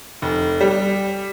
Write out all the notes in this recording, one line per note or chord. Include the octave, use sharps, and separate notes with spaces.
F1
G3